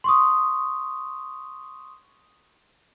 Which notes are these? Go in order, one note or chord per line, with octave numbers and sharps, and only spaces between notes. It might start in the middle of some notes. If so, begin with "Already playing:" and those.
C6 C#6 D#6